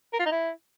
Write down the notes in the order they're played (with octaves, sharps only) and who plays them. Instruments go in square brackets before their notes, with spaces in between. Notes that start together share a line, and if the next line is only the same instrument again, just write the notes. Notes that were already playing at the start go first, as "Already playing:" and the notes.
[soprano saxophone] A#4
F4
D#4
E4